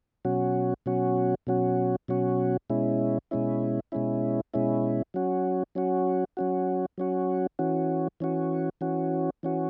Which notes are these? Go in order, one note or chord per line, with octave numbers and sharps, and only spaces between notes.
B2 F#3 C#4 F#4
B2 F#3 C#4 F#4
B2 F#3 C#4 F#4
B2 F#3 C#4 F#4
B2 G#3 C#4 E4
B2 G#3 C#4 E4
B2 G#3 C#4 E4
B2 G#3 C#4 E4
F#3 C#4 F#4
F#3 C#4 F#4
F#3 C#4 F#4
F#3 C#4 F#4
E3 C#4 F#4
E3 C#4 F#4
E3 C#4 F#4
E3 C#4 F#4